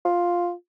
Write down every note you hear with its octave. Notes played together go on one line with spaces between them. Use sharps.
F4